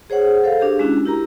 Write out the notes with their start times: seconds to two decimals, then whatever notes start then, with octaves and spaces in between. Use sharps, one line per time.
0.10 G#4 C5 C#5 F#5
0.44 A4 C5 F5
0.60 D4 G4 G#4
0.79 G#3 C#4 D4 E4 F#4
1.05 E4 G4 A#4 A#5